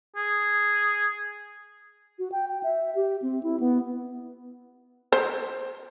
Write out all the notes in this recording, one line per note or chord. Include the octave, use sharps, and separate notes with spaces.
G#4
F#4
G5
G5
E5
G4
C4
E4
B3
C5